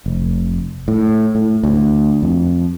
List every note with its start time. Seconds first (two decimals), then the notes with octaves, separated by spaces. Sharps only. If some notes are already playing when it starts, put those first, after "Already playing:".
0.06 F1
0.88 A2
1.35 A2
1.63 D2
2.23 F2